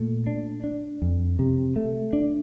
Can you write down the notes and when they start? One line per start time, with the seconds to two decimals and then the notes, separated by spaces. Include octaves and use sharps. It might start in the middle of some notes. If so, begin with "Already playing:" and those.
Already playing: A#2 A3
0.27 D4
0.64 D4
1.02 F2
1.39 C3
1.76 A3
2.13 D4